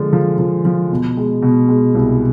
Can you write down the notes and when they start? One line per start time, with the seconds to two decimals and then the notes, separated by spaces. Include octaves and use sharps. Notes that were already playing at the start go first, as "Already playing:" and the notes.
Already playing: D3 F3 G#3
0.13 F3
0.38 F3
0.65 F3
0.91 B2
1.17 G#3
1.42 B2
1.68 G#3
1.95 C2